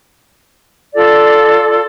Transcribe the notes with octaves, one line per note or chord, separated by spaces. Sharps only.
F4 A4 D5